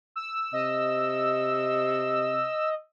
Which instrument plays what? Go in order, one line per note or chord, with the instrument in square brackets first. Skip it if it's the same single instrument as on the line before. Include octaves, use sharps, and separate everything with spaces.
[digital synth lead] E6
[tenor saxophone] C3 [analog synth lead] D#5